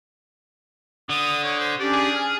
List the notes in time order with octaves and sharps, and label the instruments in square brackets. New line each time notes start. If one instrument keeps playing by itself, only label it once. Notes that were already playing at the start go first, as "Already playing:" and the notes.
[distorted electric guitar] D3 [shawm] D#6
[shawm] C#5
C5
[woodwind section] C#4 D4 G4 [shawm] D5
[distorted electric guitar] G#4
[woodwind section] G#5 F6